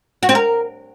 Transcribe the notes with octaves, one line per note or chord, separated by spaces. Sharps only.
F#4
C4
A#4